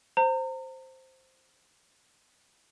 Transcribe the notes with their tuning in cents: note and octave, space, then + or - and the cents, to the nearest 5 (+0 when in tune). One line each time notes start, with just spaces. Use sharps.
C5 +0 A#5 -35